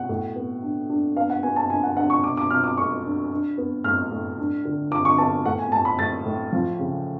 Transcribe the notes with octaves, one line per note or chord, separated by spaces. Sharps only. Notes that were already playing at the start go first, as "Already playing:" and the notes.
Already playing: B2 F#5
A2
B3
D4
D4
B3 F5
F#5
B3 G#5
A5
D4 G#5
F#5
D4 F#5
C#6
B2 D6
D6
B2 F6
D6
A3 C#6
D4
D4
B3
A2 F6
A2
D4
D3
D3 D6
C#6
B3 A5
A2 F#5
G#5
A2 A5
B5
A2 A6
A2
F3
C#3